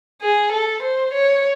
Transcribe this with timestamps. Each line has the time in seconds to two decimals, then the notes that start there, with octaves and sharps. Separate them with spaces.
0.22 G#4
0.52 A4
0.83 C5
1.13 C#5